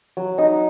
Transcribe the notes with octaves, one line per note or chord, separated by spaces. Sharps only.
F#3
D#4